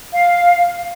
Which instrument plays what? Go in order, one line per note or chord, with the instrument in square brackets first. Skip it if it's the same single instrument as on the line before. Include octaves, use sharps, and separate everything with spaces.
[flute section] F5